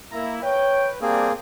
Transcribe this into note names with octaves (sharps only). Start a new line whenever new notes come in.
A#3 E4 A#5
B4 C#5 G5
G3 A#3 C4 D4 G#4